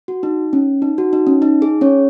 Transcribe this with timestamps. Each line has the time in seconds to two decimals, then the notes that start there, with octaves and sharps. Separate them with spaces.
0.08 F#4
0.23 D#4
0.53 C#4
0.82 D#4
0.98 F#4
1.13 D#4
1.27 C#4
1.42 D#4
1.62 G#4
1.81 C#4 C#5